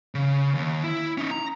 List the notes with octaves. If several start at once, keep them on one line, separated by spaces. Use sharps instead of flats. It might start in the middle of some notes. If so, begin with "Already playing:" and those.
C#3
D#2
E4
C#4 D#4
A#5